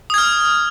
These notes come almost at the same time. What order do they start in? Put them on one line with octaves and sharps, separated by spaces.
D#6 G#6 F6